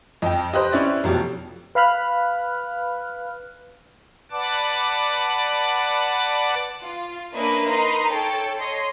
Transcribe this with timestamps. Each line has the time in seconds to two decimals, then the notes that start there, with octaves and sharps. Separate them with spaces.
0.22 F2 D#5 G5
0.53 G4 B4 C5 D#5 F#6
0.72 C#4 E4 D5
1.04 F1 B2 F3 F#3 G4
1.75 B4 F5 B5 F6 F#6
4.31 B4 D5 F#5 A5 D6
6.82 F4
7.33 A#3 C#4 D4 B4 D#5 E5
7.66 D#4 A#4 B4 A#5 C6
8.09 A4 C#5 G5 A5
8.59 C#5 D#5 C6